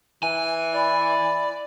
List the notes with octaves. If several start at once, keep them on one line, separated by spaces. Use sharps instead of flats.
E3 G#5
E4 D5